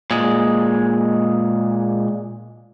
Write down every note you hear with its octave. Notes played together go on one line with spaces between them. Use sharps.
A#2 G#3